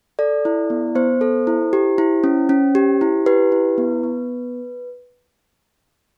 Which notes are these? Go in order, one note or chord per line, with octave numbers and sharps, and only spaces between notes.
A4 D5
E4
B3
B3 C5
A4
E4
G4
E4
C#4
C#4
G4
E4
G4 B4
E4
B3
B3